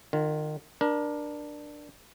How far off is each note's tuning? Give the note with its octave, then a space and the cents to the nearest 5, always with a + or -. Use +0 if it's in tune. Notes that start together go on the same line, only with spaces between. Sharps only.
D#3 -30 F4 +15
D4 +10 A#4 +30